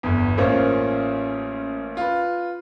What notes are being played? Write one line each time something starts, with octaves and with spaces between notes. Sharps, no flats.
G1 E2
A1 A#3 C#4 F4 C5
F4 B4